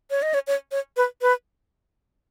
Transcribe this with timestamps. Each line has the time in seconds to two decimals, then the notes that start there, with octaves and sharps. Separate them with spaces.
0.11 C#5
0.22 D#5
0.34 C#5
0.47 C#5
0.72 C#5
0.97 B4
1.22 B4